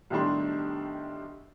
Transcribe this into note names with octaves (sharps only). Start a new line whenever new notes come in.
B1 A2 D#3 G3 D4 C6